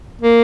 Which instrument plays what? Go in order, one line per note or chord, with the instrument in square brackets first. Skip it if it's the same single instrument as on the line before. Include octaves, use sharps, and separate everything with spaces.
[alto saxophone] A#3